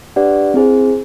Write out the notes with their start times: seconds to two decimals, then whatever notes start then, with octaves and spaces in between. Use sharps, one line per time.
0.16 D4 G4 B4 D5 F#5
0.54 C4 E4 G#4 C5